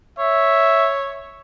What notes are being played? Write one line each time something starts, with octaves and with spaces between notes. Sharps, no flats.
C#5 E5